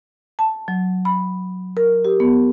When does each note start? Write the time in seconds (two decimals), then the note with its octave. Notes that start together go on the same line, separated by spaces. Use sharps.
0.39 A5
0.68 F#3
1.05 B5
1.77 A#4
2.05 G4
2.20 B3